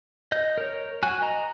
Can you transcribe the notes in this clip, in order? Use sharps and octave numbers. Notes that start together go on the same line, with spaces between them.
D#5 G6
A#4 C#5
F#4 G#5 F#6
D#5 A#5